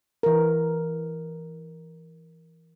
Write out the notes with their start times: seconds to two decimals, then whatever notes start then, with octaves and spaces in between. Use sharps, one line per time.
0.23 E3 A#4